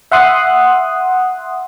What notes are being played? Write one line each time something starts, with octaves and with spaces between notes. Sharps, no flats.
E5 F#5 C6 D#6 F#6